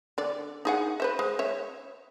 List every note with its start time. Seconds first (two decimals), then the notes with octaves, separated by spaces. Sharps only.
0.18 D3 D5
0.65 D#4 G#4 F#5
1.00 B4 C5 E5
1.19 G#3
1.39 C#5 E5